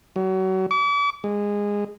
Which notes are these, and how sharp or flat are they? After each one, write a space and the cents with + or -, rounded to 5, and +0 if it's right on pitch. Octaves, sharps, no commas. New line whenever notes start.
F#3 +30
D6 -40
G#3 -20